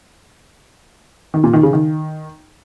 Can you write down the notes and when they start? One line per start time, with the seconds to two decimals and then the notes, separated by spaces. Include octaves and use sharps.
1.34 D#3
1.44 A#2
1.53 D#3
1.63 C#3
1.73 D#3